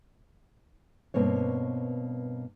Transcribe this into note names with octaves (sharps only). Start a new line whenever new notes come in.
G2 B2 A#3 C4 C#5